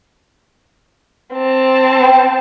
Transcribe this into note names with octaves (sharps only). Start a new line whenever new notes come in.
C4 A5
G5